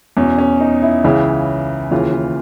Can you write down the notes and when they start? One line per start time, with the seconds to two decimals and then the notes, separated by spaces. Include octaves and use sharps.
0.17 E2 B2 C#4
0.38 C#4
0.60 D#4
0.82 E4
1.04 C#2 C#3 E3
1.91 D#2 C#3 E3 F4
2.14 F4